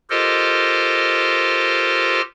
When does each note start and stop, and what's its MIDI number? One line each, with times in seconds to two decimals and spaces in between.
0.10 2.21 65
0.10 2.21 67
0.10 2.21 69
0.10 2.21 70
0.10 2.21 72
0.10 2.21 75